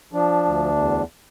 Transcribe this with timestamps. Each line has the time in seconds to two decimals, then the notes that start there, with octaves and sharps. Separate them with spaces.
0.13 F3 D4
0.45 D2
0.76 E2